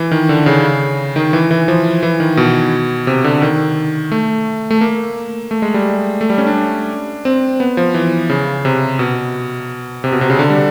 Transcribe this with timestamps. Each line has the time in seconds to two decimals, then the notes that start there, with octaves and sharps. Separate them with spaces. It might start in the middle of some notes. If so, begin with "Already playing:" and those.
Already playing: E3
0.11 D#3
0.29 D3
0.46 C#3
1.16 D#3
1.33 E3
1.51 E3
1.68 F3
2.03 E3
2.20 D#3
2.37 B2
3.07 C3
3.24 D3
3.42 D#3
4.12 A3
4.71 A3
4.81 A#3
5.51 A3
5.62 G#3
5.74 G3
6.21 A3
6.30 G3
6.38 C#4
6.47 D4
7.25 C4
7.60 B3
7.77 F3
7.94 E3
8.30 C#3
8.65 C3
8.99 B2
10.04 C3
10.12 B2
10.21 C3
10.30 C#3
10.39 D3
10.50 G3